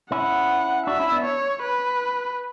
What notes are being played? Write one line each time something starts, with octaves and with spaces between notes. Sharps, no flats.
C#4 E4 F#5
D4 F#4 E5
C#4 E4
B3 D4
C#5
B4